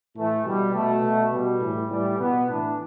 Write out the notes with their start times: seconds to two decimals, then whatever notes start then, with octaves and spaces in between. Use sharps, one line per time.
0.16 A2 E3 A3
0.45 B2 G3
0.74 B2 A3
1.03 B2
1.32 B2 G3
1.61 A2 E3
1.91 A2 E3 G3
2.19 B2 B3
2.48 A2 E3 D4